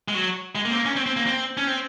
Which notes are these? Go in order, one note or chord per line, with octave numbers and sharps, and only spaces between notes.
G#3
F#3
G#3
A#3
C4
A#3
C#4
C4
C4
A#3
C4
C#4
C4